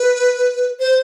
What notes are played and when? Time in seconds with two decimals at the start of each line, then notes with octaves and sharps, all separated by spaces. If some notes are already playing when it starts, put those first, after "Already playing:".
Already playing: B4
0.80 C5